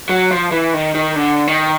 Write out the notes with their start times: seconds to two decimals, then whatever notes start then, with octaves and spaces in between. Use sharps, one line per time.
0.09 F#3
0.31 F3
0.51 E3
0.74 D#3
0.95 D#3
1.15 D3
1.47 D#3